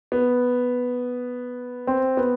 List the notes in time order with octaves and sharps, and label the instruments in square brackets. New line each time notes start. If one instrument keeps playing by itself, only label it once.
[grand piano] B3
C4
B3